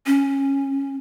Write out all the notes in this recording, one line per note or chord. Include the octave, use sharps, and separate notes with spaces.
C#4